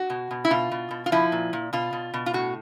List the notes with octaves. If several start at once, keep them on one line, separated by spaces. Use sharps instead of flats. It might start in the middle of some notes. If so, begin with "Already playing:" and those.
Already playing: F#4
B2
B2
E4
B2 F4
B2
B2
F4
F3 E4
A#2
A#2
B2 F4
B2
B2
F4
A2 F#4